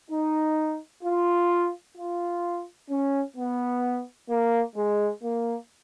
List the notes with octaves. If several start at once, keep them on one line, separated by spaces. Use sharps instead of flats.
D#4
F4
F4
C#4
B3
A#3
G#3
A#3